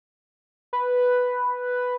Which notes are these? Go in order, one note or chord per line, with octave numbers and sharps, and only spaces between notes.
B4